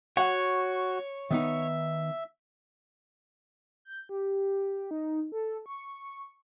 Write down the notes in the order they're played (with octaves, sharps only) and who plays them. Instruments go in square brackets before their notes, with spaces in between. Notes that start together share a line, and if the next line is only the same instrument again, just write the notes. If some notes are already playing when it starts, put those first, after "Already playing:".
[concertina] F#4 [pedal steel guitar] C#5 [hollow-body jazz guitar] F#5
[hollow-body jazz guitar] D#3 B3 D#4 [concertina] E5
[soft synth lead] G6
G4
D#4
A4
C#6